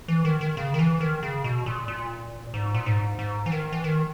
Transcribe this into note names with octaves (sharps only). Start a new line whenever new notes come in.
E3
D#3
D#3
C#3
D#3
E3
D#3
C#3
B2
A#2
A#2
G#2
A#2
G#2
G#2
E3
D#3
E3
D#3